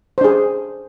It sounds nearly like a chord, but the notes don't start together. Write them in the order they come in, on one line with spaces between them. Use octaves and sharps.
C5 D4 G#4